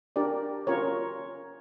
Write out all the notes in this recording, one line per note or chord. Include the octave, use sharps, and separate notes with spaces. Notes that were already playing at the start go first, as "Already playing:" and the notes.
D4 G4 A#4 D5
C#4 F4 A#4 C#5